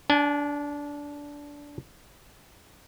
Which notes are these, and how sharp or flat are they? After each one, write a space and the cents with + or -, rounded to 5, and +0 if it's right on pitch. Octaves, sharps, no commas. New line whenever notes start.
D4 -20 G#5 +30